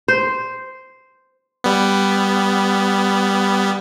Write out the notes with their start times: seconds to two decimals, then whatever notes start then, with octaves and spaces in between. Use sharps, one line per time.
0.08 C5
1.64 G3 B3